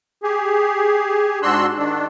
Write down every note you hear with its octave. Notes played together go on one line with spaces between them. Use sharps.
G4 G#4
G#2 D4 F#4 C6 E6 F#6
D#3 D4